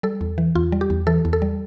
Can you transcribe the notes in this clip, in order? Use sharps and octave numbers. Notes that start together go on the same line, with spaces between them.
G3 A4
E2
E3
E2 F4
G3
G4
E2
E3 A4
E2
A4
G3